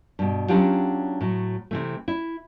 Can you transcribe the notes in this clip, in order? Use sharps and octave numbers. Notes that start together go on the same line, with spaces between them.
G2 B2
F#3 C#4 D4 F4 G4 F#5
A2 F#3
C3 E3 A3
E4